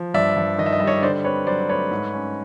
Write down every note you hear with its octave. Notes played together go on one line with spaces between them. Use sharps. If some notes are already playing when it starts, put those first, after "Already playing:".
Already playing: F3
G2 D5 E5
G2
D#3 D#5
E5
D#5
G3 E5
C#5 D#5
D3 C5 D5
C4 B4 C#5
F#3 C5 D5
A3 B4 C#5
G#2
C#4